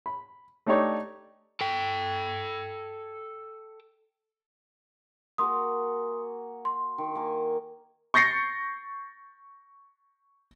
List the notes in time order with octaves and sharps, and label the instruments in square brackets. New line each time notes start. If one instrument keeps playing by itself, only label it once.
[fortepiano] B5
A3 D4 D#4 G4 C#5 D5
[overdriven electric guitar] A4 G5
[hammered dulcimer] A#3 F#4 G#4 [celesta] C6 D#6
[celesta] C6
[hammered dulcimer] D#3
A#3 G#5
[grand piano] C#6 G6 A6 A#6 C7 C#7